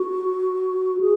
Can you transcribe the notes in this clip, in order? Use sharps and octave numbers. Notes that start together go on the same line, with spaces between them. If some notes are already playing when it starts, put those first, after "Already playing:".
Already playing: F#4
G#4